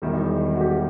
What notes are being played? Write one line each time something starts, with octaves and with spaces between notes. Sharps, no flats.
E1 E2 D#3 G3 E4
D#4
E4
F#4
G4